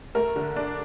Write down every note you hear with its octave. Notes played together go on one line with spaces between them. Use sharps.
A3 A#4
D3
D4